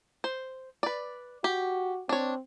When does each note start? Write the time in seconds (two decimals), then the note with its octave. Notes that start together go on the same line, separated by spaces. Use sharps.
0.24 C5
0.83 B4 D5
1.44 F#4 G4
2.09 C4 D4 C#5